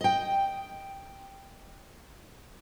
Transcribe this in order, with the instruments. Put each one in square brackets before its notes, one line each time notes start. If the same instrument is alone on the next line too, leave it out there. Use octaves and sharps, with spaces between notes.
[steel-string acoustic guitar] D#5 G5